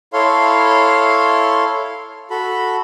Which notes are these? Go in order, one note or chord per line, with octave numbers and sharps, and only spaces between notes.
E4 A4 C#5 F5 C6
F#4 A4 B5